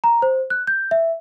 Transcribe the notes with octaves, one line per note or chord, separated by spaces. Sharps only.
A#5
C5
F#6
G6
E5